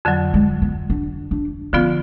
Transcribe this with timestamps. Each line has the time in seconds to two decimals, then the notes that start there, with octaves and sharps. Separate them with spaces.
0.05 F2 D3 F#3
0.34 G#3
0.62 B3
0.90 D4
1.31 D4
1.73 D3 F3 B3 C#4 F4